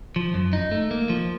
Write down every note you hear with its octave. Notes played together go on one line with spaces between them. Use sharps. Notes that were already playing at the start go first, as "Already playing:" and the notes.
F3
F#2
D#4
A3
A#3
F3